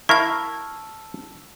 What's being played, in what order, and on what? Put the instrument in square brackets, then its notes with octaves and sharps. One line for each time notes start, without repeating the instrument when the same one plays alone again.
[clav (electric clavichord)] E4 A#4 F5 [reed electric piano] A5 E6 F6 [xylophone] C#6 G#6